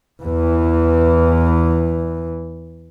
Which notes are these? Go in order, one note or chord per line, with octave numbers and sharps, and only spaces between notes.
E2 E3